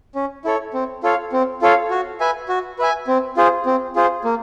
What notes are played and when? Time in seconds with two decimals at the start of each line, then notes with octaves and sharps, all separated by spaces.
0.15 C#4
0.45 E4 A4 C#5
0.73 C4
1.03 F4 A4 C#5 F5
1.32 C4
1.62 F4 A4 C#5 F5
1.91 F#4
2.20 B4 E5 G#5
2.49 F#4
2.79 B4 E5 G#5
3.07 C4
3.37 F4 G#4 C5
3.66 C4
3.96 F4 G#4 C5
4.24 A#3